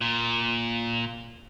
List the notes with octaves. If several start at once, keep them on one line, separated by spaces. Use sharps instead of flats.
A#2